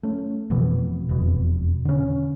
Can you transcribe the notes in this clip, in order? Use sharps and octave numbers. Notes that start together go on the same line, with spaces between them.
A3 C#4
F1 F2 B2 E3
E1 F2 B2
D3 C#4